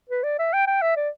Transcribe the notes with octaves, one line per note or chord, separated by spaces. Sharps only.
B4
D5
E5
G5
G5
E5
D5